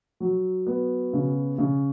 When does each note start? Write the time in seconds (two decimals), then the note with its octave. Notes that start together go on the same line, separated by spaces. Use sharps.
0.20 F#3
0.67 B3
1.13 C#3
1.58 C#3